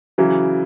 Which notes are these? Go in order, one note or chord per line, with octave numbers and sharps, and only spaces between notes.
C#3 E3 F#3